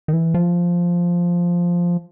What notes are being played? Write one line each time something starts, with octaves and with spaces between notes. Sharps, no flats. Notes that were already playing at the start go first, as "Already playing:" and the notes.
D#3
E3
F3